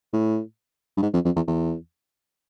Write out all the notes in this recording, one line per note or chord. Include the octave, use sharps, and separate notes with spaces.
A2
G2
G#2
F2
F2
E2
E2